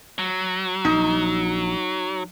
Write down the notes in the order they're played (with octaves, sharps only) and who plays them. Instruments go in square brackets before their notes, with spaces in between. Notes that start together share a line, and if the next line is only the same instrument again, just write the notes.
[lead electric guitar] F#3
[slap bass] A#1 [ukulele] D#4